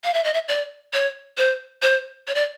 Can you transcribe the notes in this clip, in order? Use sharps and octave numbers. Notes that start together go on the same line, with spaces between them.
F5
E5
D#5
E5
D5
C#5
C5
C5
C#5
D5